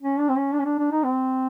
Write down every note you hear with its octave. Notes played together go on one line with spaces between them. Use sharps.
C#4
D4
C4
C#4
D4
C#4
D4
D4
D#4
C4